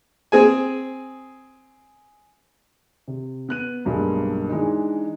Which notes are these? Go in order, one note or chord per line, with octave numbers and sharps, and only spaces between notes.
C4 G#4 G#5
C3
B3 F#6 D#7
B1 G2 B2 G#3 A#3
E3 G#3 D4 D#4